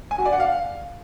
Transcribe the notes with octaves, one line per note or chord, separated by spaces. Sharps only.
G#5
F#4
D5
F#5
F5